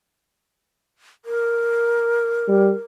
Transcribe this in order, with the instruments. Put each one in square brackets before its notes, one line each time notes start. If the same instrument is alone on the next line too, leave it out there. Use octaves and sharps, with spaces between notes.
[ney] A#4
[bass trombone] G3